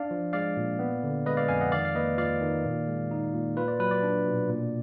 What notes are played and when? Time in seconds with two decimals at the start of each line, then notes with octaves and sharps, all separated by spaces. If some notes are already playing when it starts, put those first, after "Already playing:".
Already playing: D4 D5 F5
0.11 F3
0.33 G#3 D5 F5
0.57 A#2
0.79 B3
1.03 D3
1.26 G#3 B4 D#5
1.37 D5 F5
1.48 F2 F5 G#5
1.61 D#5 F#5
1.72 D#3 D5 F5
1.85 F5
1.95 A#3 B4 D#5
2.18 F4 D5 F5
2.41 D#3
2.65 A#2
2.88 G#3
3.11 D#4
3.33 A#2
3.57 F4 B4
3.68 D5
3.79 F#3 B4
3.91 D5
4.03 D4
4.26 B2
4.49 A#2